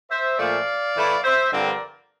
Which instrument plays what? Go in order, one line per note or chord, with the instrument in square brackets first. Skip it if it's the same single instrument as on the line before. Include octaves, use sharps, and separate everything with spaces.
[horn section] C5 E5
A#2 F3 A3 D5 F5
A2 E3 A3 E4
C5 E5
G2 D3 F3 C4 A#4 D5